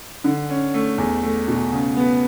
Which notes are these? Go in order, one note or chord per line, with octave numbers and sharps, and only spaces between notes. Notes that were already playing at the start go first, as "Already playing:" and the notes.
D3
C#4
A3
E2
A3
B2
C#3
B3